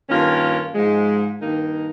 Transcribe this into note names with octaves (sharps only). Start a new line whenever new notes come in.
G2 D#3 A#3 C#4 F4
G#2 F3 G#3
G2 D#3 A#3 D#4